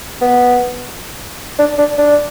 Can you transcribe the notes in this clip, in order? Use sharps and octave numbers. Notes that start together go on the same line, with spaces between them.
B3
D4
D4
D4